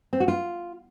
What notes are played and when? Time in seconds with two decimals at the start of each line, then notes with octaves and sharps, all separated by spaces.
0.13 C4
0.20 F#4
0.28 F4